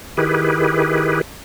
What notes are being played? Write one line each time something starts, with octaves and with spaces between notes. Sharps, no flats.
D#3 E4 G4 G#4 B4